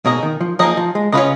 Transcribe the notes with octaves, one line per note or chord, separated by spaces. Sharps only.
B2 A#3 D#4 G#4 D#5
D#3
F3
F3 A#3 D#4 G#4 D#5
F3
G#3
C#3 C#4 F4 B4 D#5